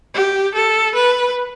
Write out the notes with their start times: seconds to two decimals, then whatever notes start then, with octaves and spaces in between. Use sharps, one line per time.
0.14 G4
0.54 A4
0.94 B4